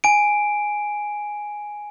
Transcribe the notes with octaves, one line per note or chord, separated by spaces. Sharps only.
G#5 D7